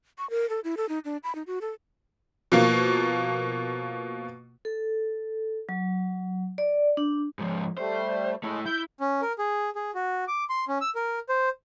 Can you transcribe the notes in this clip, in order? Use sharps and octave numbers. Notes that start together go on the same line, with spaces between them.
C#6
A#4
A4
E4
A4
D#4
D4
B5
D#4
F#4
A4
B2 F3 A#3
A4
F#3
D5
D4
G#2 F3
G3 A3 C5
G#3 A3 E4
E4 G6
C#4
A#4
G#4
G#4
F#4
D6
C6
C#4
E6
A#4
C5